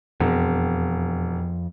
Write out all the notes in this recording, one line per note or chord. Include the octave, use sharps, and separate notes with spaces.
E1 F2